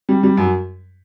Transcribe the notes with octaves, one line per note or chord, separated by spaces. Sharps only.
G3
G3
F#2